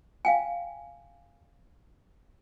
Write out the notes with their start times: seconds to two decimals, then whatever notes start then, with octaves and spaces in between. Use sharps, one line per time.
0.25 F5 G5 G#5